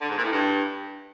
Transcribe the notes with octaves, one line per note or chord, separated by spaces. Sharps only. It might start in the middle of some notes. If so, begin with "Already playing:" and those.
D3
G#2
A#2
A2
G2